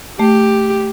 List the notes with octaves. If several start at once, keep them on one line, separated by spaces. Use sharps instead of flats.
A3 G4